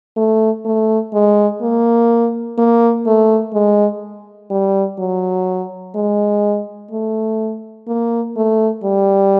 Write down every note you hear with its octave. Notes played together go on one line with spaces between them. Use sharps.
A3
A3
G#3
A#3
A#3
A3
G#3
G3
F#3
G#3
A3
A#3
A3
G3